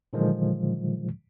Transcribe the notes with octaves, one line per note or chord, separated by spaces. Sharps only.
A#2 D3 D#3 F3 F#3 G#3